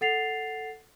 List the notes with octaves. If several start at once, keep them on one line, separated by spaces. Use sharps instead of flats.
A4 F#5 A6 C7 F7